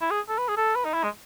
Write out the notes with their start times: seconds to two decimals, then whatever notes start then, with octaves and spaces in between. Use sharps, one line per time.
0.01 E4
0.10 G#4
0.28 A4
0.38 B4
0.48 G#4
0.57 A4
0.75 B4
0.85 D#4
0.93 E4
1.03 G#3